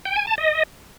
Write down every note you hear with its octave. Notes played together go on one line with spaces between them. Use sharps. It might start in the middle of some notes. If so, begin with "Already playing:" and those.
G5
G#5
A5
D#5